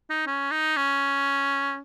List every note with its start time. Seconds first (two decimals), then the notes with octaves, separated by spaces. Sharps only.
0.10 D#4
0.27 C#4
0.51 D#4
0.77 C#4